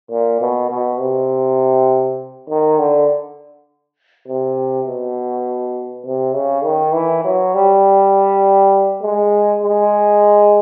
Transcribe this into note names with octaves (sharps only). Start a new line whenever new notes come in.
A#2
B2
B2
C3
D#3
D3
C3
B2
C3
C#3
D#3
E3
F#3
G3
G#3
G#3